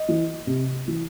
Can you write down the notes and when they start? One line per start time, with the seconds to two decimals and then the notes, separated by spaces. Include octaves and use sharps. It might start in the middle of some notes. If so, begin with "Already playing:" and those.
Already playing: D#5
0.08 E3
0.47 C3
0.88 E3